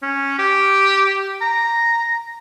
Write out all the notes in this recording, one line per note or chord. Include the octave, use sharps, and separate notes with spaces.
C#4
G4
A#5